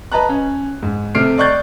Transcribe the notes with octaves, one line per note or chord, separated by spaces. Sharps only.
B4 D#5 A5 A#5 F#6
C#4
G#2
C3 A3 F6 C7 D7
D5 D#5 C#6 F#6 G6 A6